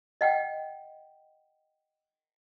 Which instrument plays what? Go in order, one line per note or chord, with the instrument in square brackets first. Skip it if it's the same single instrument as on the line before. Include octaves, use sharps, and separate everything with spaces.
[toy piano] D#5 F#5 G5